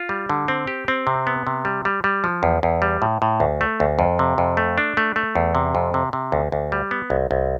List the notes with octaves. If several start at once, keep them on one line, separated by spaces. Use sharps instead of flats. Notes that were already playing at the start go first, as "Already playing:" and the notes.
Already playing: F4
G3
D3
C4
G4
C4
C3
B3
C3
G3
G3
G3
F3
E2
E2
G3
A2
A2
D2
A3
D2
F2
C3
F2
A3
D4
A3
A3
E2
C3
F2
C3
C3
D2
D2
G3
B3
C2
C2